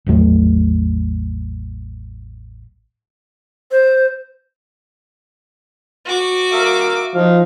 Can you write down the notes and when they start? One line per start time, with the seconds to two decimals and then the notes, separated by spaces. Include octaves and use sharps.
0.07 A1 E2 F#3 A3
3.71 C5
6.06 F#4 D6
6.53 A#4 E5 F5
7.14 F3 D#4 F5